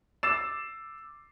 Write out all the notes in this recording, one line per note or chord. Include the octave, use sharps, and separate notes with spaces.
D6 E6 A6 C7 E7